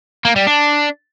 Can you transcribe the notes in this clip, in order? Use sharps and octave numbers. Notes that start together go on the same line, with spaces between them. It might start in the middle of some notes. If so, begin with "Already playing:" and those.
A#3
G3
D4